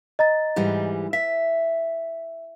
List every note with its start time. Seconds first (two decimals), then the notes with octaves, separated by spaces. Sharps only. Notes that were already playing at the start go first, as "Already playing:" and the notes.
0.19 D#5 A#5 A6
0.56 G#2 E3 G3
1.13 E5 B6